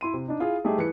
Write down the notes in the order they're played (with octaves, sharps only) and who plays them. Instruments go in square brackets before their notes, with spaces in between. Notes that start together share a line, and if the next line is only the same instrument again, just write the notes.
[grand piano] E4 C6 D#7
C3
D4 D#4
E4 F4 G#4
G3 A3 D#4 G4 G#4 E5
E3 B4 C#7